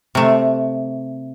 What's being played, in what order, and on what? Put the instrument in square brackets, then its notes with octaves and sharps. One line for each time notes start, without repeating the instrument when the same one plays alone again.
[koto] C3 A3